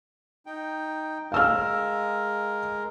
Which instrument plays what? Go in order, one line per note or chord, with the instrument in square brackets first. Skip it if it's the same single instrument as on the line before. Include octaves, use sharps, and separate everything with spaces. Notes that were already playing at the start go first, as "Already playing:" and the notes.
[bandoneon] D#4 G5
[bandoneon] G#3 A#4 [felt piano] F5 E6 F6